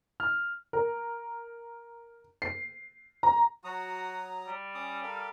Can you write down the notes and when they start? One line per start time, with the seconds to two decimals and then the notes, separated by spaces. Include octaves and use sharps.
0.20 F6
0.73 A#4
2.42 C7
3.23 A#5
3.64 F#3 F#4 A#5 D#6
4.47 G3
4.75 C#4 D6 D#6
5.03 A4 A#4 F5